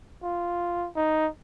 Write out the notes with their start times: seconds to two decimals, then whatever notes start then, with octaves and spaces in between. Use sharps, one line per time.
0.23 F4
0.96 D#4